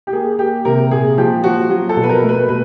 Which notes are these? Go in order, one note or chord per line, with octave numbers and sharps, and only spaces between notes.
G4
A#3 G#4
A#3 G4
C3 A#4
A#2 G#4
F3 G4
F3 F#4
F#3
A4
B2
B4
A#4
A3
B4
B2 B4